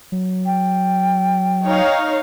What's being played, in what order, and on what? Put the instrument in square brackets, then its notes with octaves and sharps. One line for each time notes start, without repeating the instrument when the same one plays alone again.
[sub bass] F#3
[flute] G5
[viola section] D#4 C#5 F5